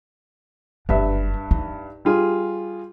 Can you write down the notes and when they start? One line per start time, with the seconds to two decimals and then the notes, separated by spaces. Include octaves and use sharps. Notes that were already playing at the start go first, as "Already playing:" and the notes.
0.89 F#1 G2 D4 B4 E5
1.51 D#4
2.05 G3 F4 G#4